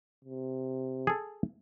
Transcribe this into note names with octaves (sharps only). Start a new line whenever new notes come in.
C3
G#4 A4